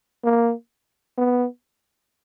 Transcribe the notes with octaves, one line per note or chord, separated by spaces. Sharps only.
A#3
B3